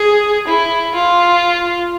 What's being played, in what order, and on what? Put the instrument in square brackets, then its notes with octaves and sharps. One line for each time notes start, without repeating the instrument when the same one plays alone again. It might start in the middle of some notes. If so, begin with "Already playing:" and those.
Already playing: [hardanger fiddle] G#4
E4
F4